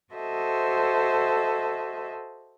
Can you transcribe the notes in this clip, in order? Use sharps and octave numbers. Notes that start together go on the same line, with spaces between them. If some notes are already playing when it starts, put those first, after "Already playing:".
F#4 A4 C5 D#5 E5